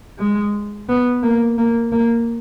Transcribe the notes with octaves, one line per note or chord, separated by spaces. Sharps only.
G#3
B3
A#3
A#3
A#3